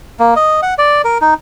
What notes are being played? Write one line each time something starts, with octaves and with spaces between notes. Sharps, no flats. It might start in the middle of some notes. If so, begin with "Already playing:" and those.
A#3
D#5
F#5
D5
A#4
D#4